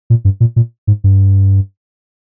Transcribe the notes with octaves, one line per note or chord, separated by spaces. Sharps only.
A#2
G2
A#2
A#2
G#2
G2